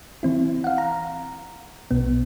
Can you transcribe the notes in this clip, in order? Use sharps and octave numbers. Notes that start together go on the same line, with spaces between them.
E3 C4 E4
F5 F#5
A#5
B1 B2 B3